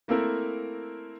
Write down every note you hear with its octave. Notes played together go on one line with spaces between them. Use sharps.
A3 A#3 C4 E4 A4 A#4